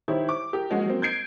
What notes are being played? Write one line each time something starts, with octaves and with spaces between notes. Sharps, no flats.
D#3 E4 G4 C5 C#5
D6
G4 A#4
F3 G#3 A#3 C#4 F#4
F#3 A#3 C4
G6 G#6 C7 D7